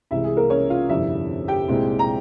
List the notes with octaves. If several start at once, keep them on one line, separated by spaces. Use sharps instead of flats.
C2 C3 E3 G#3 E4 E5
G#4
A#3 A#4
C#4 C#5
F4 F5
G1 F2 C3 G3 E4 E5
G4 G5
C2 A#2 G#3 C4 E4
A#5